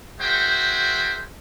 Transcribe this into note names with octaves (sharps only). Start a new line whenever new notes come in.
F#4 G#4 A#4 C5 E5 G5